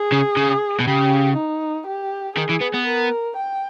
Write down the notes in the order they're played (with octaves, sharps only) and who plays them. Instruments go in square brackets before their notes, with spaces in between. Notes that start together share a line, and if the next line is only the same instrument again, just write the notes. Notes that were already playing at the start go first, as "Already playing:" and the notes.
Already playing: [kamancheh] G#4
[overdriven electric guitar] C#3
C#3
B2
[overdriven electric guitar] C#3 [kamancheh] G4
[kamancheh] D#4
G4
[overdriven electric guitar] D#3 [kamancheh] G#4
[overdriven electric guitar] E3
B3
B3
[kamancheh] A#4
G5